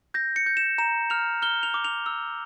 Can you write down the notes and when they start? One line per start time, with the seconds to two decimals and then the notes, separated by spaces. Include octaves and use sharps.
0.14 G6 A#6
0.36 C#7
0.46 G6
0.57 E7
0.78 A#5 E7
1.10 F6 F7
1.42 F6 G7
1.63 F7
1.74 D6
1.85 F7
2.06 E6